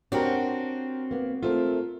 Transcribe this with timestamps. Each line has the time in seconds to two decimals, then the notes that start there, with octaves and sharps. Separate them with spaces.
0.12 C4 D4 F#4 G4 A#4 C#5
1.11 A#3 B3
1.43 A3 C4 F4 A#4